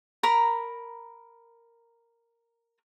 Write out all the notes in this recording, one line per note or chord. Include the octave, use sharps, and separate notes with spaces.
A#4 A#5 B5